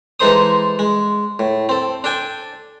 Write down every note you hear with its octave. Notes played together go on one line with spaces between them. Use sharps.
E3 G#3 D#4 A4 C5 D#6
G#3
A2
C4 A4
D4 A4 G5 G#5